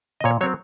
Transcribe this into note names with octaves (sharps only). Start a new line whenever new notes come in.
D#5
A#2 C#5
F#3 C4 C#5